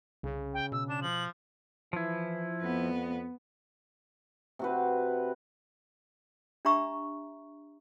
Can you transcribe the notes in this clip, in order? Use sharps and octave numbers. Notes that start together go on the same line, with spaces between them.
C2 C#3
G5
B2 E6
D4 E7
F3 F#7
E3 F3 E4
F2 B3
C3 F#4 B4
D4 G4 E5 A#5 C#6 E6